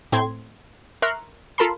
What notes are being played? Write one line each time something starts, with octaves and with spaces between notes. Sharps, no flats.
A2 C4 C6 G#6
A#4 E5 C6 C#6 F6 F#6
F4 A4 A#4 A5 B5 C6